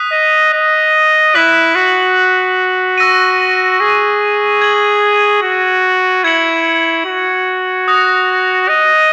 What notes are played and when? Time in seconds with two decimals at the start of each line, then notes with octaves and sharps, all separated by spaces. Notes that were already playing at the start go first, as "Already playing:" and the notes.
Already playing: D#6 F#6 B6 D#7
0.12 D#5
0.54 D#5
1.35 E4 F#6 B6 F#7
1.75 F#4
2.98 C#6 E6 A#6 D#7
3.80 G#4
4.61 G#6 D#7 F#7
5.42 F#4
6.24 E4 G#6 C#7 F#7
7.06 F#4
7.88 D#6 F#6 A#6
8.69 D#5